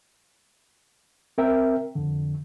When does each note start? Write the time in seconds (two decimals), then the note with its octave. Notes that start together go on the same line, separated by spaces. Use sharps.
1.38 C4 A#4 E5 G5
1.95 F2 D3